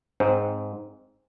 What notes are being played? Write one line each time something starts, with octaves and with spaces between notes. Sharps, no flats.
G#2 C4